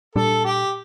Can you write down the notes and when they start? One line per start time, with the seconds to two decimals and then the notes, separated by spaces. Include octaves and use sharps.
0.15 A#2 G3 D4 A4
0.45 G4